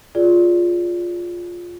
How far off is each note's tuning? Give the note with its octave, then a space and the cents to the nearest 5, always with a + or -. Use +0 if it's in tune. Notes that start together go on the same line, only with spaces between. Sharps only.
F4 +5 G#4 +0 D5 -20